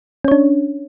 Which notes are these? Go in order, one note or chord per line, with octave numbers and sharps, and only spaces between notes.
C#4 D4 C#5